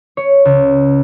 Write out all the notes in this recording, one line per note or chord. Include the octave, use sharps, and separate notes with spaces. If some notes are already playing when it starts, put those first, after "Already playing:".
C#5
C#2